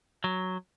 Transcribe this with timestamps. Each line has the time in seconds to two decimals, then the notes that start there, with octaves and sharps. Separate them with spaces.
0.24 F#3